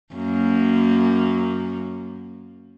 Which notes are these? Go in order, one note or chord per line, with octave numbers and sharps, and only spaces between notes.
F#2 A#3